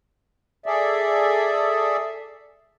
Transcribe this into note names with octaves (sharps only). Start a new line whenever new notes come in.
G#4 A4 D5 E5